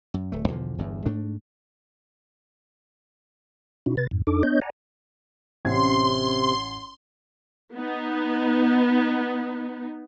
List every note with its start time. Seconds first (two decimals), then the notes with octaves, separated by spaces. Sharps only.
0.14 F#2
0.32 D1 A3
0.48 B1 E2 D3 F3
0.78 G1 E2 G2
1.06 G#2 A3 D4
3.86 B2 C#4 D#4 E4 F#4
3.97 C3 B4 A6
4.11 F2 G#2
4.27 F2 D4 D#4 A4 D6
4.43 B3 D4 C#5 D#5 G6
4.61 D5 F#5 G#5 A#5
5.65 A1 C3 C#4 C6 G#6
7.74 B3 D#4